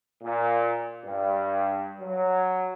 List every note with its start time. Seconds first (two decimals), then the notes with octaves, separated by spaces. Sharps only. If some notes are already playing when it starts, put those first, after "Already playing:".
0.23 A#2
1.05 G2
1.99 F#3